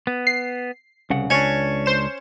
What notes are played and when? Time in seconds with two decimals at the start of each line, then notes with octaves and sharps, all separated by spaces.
0.07 B3
0.27 C7
1.10 C2 C#3 F#5
1.30 C#2 C#4 D4
1.86 C5 E7